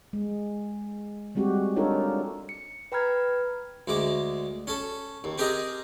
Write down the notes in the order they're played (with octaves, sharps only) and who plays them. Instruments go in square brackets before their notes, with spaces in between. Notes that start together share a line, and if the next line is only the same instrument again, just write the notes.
[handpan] G#3
G3 G#3 C4 F#4 G4
D4 D#4 F4 A4 A#4 C#5
[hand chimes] C#7
B4 G5 A#5 B5 F6 G#6
[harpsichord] D2 G#3 D6
C#4 A4
D#2
C4 G4 G#4 A#4 D#5